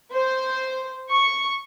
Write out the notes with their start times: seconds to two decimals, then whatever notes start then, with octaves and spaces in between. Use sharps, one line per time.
0.13 C5
1.11 C#6